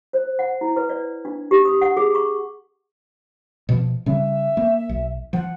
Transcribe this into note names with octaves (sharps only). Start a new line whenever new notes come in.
C5
F#5
E4
B4
D5
D4
G4
D#6
F#5
G#4
C#6
B2 F3
C#3 G3 C#4 E5
A#3
B1
F3 F#5